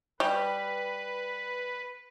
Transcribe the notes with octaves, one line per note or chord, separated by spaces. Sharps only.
G3 B4